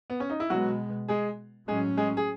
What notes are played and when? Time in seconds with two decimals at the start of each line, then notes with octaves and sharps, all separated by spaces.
0.10 B3
0.20 C#4
0.30 D#4
0.40 E4
0.50 B2 F#3 G#3 B3 F#4
1.08 G#3 G#4
1.67 A2 F#3 G#3 C#4 G#4
1.97 G#3 G#4
2.17 G#4